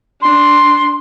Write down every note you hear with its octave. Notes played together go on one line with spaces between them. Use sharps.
D4 C6